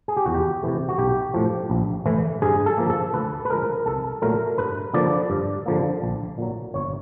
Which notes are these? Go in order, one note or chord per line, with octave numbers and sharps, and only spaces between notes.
G#4
G4
E2 F#4
G4
C3 E3 A3
F#4
B1 G4
A2 F3
A#1
A2 E3
G2 G#4
A4
D3 F3 A#3
A4
D2 B4
B4
D3 F3 G#3 A#4
C2 A4
A#2 F#3 A3 A#4
G2 B4
D3 F3 A#3 D5
G2
D3 F3 A#3
A#1
A#2 F#3
G1 C#5